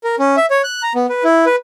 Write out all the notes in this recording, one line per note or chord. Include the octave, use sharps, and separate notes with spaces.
A#4
C#4
E5
C#5
F#6
A#5
B3
B4
E4
B4